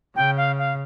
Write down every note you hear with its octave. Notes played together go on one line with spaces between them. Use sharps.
C#3 G5
F5
F5